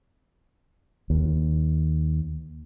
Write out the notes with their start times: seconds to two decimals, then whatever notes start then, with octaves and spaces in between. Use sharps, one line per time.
1.10 D#2